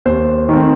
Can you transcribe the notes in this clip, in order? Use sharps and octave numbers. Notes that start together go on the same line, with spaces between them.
D#2 C5
D#3 A3 C4